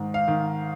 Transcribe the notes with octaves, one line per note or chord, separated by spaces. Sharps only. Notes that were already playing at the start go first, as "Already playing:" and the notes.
Already playing: G#2 D#3
F5
D#3